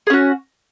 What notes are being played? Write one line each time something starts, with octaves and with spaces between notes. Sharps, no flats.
C#4 F#4 G#4